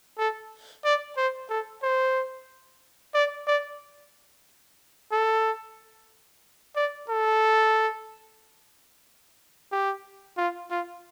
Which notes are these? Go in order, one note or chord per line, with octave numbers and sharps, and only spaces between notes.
A4
D5
C5
A4
C5
D5
D5
A4
D5
A4
G4
F4
F4